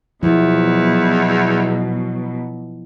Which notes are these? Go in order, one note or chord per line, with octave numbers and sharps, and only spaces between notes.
E2 B2 F3 F#3 E4